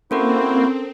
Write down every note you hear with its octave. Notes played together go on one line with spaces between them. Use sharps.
A#3 C4 C#4 E4 F#4 A4 A#4 C5